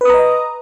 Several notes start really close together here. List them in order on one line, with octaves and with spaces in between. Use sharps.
B4 D#6 A#5 D#5